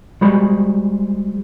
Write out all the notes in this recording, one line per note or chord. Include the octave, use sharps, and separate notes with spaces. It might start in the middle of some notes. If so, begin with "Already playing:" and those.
G3 G#3 F#4 G#4 C5 B5